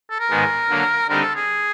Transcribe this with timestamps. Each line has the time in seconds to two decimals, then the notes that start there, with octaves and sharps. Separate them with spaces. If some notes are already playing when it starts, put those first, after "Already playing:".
0.10 A4
0.19 A#4
0.30 G#2 D#3 G#3 B3
0.69 D3 F#3 A#3
1.08 D3 G3 C4 D#4 G4 A#4
1.22 A4
1.35 G#4